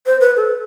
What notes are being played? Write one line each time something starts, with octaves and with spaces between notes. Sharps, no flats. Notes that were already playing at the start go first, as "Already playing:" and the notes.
C5
B4
A4